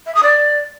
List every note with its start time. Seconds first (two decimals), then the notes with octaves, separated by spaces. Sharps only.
0.06 E5
0.15 D#6
0.23 D5